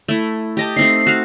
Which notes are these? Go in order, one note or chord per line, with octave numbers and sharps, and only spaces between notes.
A3 E4
G4 D#5 A5
A3 C4 D#4 C7
F#4 F5